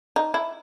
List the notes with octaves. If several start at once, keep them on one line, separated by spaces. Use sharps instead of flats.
D#4
E4